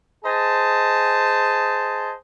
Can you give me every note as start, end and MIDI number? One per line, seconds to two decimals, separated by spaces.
0.24 2.12 68
0.24 2.12 72
0.24 2.12 75
0.24 2.12 80
0.24 2.12 81